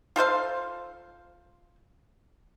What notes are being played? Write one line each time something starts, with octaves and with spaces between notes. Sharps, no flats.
F4 A4 C5 F5